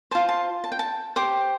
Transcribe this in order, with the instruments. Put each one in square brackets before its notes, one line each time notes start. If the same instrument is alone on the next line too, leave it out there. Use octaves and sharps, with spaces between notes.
[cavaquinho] F4 C5 A5
A5
A5
G5
A5
G4 C5 D6